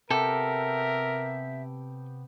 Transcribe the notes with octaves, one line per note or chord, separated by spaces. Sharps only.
C3 B3 G4 A4 A#4 E5